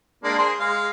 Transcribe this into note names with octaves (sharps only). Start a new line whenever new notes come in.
G#3 A#3 D4
G#4 C5 C6
G#3 F5